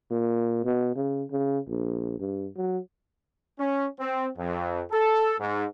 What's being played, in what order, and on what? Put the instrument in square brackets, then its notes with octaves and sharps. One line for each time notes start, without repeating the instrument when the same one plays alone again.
[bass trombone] A#2
B2
C#3
C#3
A#1
G2
F#3
[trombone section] C#4
C4
F2
A4
G#2